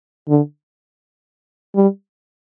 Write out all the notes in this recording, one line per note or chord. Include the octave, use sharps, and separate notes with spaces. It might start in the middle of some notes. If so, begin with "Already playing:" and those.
D3
G3